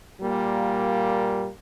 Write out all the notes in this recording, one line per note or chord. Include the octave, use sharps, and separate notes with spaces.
A#2 G3 A#3